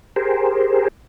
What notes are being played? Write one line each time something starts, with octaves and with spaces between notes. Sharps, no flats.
G4 G#4 A#4 C5